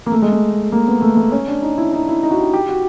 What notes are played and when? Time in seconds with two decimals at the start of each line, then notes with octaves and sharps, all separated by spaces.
0.06 A#3
0.12 A3
0.22 G#3
0.32 A3
0.72 A#3
0.88 B3
1.02 A3
1.17 A3
1.32 C#4
1.47 D4
1.62 D#4
1.78 E4
1.93 D#4
2.08 E4
2.23 D#4
2.31 F#4
2.39 G4
2.54 G4
2.69 F#4